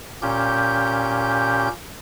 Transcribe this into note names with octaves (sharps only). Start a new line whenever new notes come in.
A#2 C#4 G4 G6